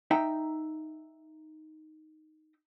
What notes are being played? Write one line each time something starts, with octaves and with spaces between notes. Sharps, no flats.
D#4 E5 G5 A#5